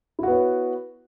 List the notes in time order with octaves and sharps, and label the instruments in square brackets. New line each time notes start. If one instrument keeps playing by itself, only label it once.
[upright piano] E4
F#4
B3
C#5